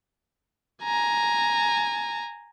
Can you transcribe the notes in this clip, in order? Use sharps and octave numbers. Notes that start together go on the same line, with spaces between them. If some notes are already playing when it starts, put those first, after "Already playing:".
G#5 A#5